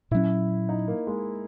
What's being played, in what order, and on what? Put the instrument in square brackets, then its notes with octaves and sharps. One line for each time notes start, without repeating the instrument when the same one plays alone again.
[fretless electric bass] A#2 F#3 C#4 [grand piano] E4
[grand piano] D#4
A#3
G#3